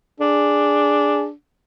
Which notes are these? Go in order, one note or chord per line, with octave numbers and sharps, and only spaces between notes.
D4 G#4